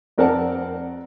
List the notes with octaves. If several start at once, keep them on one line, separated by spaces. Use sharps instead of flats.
F2 C4 A#4 D5 F#5 A5